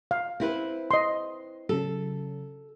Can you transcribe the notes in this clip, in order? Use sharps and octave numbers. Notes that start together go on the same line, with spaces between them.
F5
C4 E4 B4
D#5 C6
C#3 F#3 A4